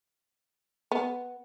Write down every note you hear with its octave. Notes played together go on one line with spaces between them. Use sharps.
B3